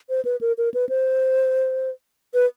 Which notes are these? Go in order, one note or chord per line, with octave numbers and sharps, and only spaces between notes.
C5
B4
A#4
A#4
B4
C5
B4